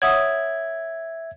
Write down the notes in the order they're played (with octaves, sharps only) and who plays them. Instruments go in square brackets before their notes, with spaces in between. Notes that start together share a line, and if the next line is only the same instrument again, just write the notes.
[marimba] C#5 F#5 D#6 [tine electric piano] E5 G#6